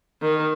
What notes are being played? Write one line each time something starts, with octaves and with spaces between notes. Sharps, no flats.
D#3